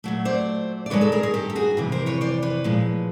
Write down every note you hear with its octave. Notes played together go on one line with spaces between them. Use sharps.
A#2 F#3 A3
C5 D5
D5
G2 D#3 G#3 B4 C#5
A4 B4
G#4 A#4
G#4 A#4
G4 A4
G4
F#4 G#4
F2 C3 E3
A#4 C5
B4 C#5
C5 D5
B4 C#5
A#2 F3 G#3